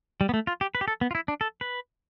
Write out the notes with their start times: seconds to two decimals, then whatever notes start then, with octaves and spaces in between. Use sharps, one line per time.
0.21 G3
0.29 B3
0.34 A3
0.47 F4
0.61 G4
0.75 B4
0.81 G4
0.88 A4
1.01 B3
1.11 F4
1.15 E4
1.28 D4
1.41 A4
1.61 B4